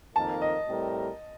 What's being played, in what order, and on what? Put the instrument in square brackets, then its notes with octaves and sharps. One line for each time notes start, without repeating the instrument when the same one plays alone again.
[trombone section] F2 D#3 A#3 D#4 A#4 [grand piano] A5
[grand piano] D#5
[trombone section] A2 G3 C4 G4 A#4